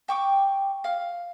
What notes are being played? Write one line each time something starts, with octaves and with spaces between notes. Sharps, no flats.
G5 C#6 D6
F5